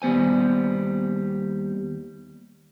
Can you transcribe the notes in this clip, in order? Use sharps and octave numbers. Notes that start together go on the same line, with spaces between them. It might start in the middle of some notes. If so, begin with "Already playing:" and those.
D#2 G3 B3 C5 G#5